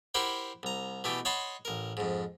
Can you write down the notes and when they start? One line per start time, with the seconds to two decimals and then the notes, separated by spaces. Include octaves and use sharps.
0.14 E4 G4 A#4 C5 F#5 B5
0.63 C2 A#5
1.04 B2 E3 A3 G4
1.25 C#5 D#5 F#5 A5 B5 C6
1.65 A1 A#4
1.97 F2 G#2